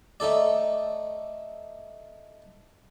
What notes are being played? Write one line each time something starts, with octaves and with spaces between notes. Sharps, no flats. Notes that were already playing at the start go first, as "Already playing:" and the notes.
A3 D#4 A4 D5